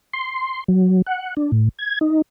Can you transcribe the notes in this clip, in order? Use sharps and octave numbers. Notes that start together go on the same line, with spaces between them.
C6
F#3
F#5
D4
A2
G#6
D#4